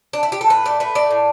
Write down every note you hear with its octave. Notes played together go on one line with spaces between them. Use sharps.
D4
E4
G4
A4
A2 B4
A3 D5
A3 B4
A2 D5
A2